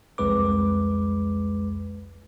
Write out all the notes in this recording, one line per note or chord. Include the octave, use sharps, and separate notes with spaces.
C2 F2 G#3 B4 D6